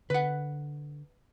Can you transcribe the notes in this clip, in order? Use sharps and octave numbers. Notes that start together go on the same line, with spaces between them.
D3 B4 F#5